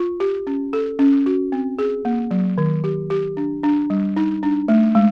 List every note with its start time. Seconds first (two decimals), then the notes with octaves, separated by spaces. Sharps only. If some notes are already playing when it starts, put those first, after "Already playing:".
Already playing: F4
0.20 G4
0.47 C#4
0.73 A4
0.99 C#4
1.26 F#4
1.52 C4
1.79 G#4
2.05 A#3
2.31 F#3
2.58 D#3
2.84 G4
3.10 G4
3.37 D4
3.63 D4
3.90 G3
4.16 D#4
4.43 D4
4.68 A3
4.95 G#3